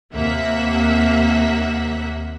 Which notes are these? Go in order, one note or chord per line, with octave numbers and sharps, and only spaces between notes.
D#2 C3 A#3 E5 F#5 B6